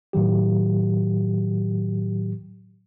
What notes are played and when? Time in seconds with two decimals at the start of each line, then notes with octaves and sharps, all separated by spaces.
0.13 A2 D#3 F#3 G4